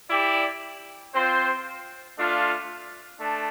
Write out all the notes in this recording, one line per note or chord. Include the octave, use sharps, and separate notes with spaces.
E4 G4 D5
C4 F4 C5
A3 D4 F4
A3 D4